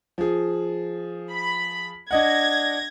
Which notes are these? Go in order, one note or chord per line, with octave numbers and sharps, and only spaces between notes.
F3 G#4
B5
D4 D#5 F#5 G#6 A#6